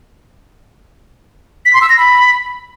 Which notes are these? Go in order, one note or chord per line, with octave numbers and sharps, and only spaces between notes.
B6
C6
E6
A#6
B5